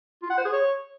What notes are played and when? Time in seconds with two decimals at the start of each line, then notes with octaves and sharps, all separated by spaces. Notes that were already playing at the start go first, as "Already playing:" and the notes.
0.23 F4
0.30 F#5
0.38 C5
0.45 G#4
0.53 C#5